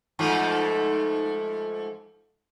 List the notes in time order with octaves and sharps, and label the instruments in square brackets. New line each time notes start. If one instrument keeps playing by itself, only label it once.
[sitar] G#2 F3 A3